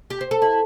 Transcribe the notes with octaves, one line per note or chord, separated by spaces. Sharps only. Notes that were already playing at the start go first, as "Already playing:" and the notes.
G4
C5
A4
E4